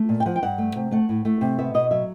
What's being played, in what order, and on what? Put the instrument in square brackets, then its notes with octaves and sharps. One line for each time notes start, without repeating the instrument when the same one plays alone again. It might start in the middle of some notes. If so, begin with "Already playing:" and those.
Already playing: [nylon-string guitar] A3
A#2
G5
F3 F#5
G5
G2 F#5
A3
C3
A3 F#5
A2
A3
C3
B3 E5
B2 D#5
F#3 E5